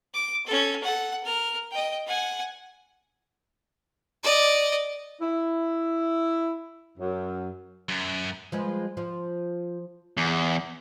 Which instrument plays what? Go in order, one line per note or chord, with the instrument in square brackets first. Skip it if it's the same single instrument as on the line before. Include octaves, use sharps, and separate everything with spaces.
[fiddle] D6
C#4 A4
A4 F#5
A#4 F6
D#5 G5
F#5 G#5
D5 D#5
[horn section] E4
F#2
[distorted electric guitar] F#2
[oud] F3 G#3 B4
F3
[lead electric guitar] E2